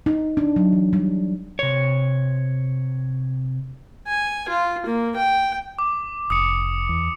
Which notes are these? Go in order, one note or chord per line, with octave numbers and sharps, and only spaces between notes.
D#4
D4
F#3
E3
G3
C3 C#5
G#5
F4
A#3
G5
D6
F1 D#6 C#7
E2